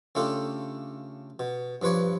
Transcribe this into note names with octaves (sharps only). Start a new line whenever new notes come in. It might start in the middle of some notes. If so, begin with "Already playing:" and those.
C#3 A3 D4 F4 G4 A4
B2
G2 F3 B4 C#5 D5